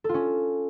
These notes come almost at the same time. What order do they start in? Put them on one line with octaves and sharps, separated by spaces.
A4 F4 C#4